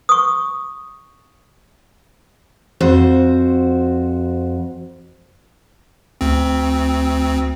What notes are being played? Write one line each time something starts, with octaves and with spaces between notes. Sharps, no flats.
C#6 D#6
F2 F#4 C5
D2 C4